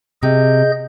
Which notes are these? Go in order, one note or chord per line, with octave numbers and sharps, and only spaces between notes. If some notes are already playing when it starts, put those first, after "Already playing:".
C3 G#4 D#5 G6